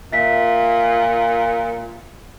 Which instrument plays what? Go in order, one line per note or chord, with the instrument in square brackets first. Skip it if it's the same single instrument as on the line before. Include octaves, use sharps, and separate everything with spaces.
[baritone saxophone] A#2 [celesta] E5 B6